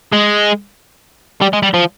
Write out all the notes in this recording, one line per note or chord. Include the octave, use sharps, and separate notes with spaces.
G#3
G3
G#3
G3
F3